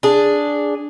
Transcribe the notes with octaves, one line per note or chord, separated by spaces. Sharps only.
D4 G#4